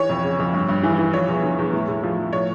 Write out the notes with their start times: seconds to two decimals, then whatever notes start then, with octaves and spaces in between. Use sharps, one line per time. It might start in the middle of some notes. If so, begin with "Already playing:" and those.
Already playing: E3 C#5
0.09 F2
0.23 C#3
0.39 F2
0.53 G2
0.69 G2
0.83 E3
0.98 E3
1.13 F3 C#5
1.28 E2
1.43 D3
1.58 E2
1.73 A2
1.88 A2
2.03 F3
2.18 F3
2.33 A2 C#5